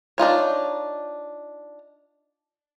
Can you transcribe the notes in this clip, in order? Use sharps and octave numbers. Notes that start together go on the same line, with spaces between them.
D4 D#4 F4 C#5